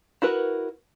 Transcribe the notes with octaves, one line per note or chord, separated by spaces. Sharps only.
E4 F#4 A#4 B4